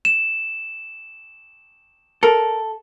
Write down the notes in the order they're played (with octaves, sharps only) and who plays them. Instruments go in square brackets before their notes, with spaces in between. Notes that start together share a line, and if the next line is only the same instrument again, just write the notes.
[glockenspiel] E7
[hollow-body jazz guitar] A4 [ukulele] A#4